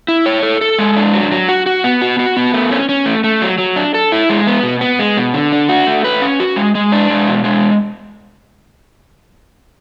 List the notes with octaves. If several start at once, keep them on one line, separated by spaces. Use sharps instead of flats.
E4
C#5
A4
A4
G#3
D4
F#3
F#3
F#4
F#4
B3
F#4
F#4
B3
A3
C#4
C#4
A3
A3
F#3
F#3
D4
A4
E4
G#3
B3
B2
B3
G#3
B2
D3
D4
F#4
A3
B4
C#4
F#4
G#3
G#3
D4
G#3
B2
G#3